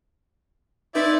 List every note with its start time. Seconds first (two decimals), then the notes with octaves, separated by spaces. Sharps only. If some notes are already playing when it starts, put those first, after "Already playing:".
0.95 C4 D#4 E4 B4 D5